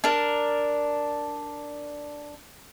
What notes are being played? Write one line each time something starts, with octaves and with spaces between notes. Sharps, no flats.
D4 A#4